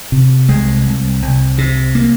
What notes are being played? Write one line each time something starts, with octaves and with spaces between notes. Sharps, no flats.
C3
C2 G#3
C2
C2
C3
A#3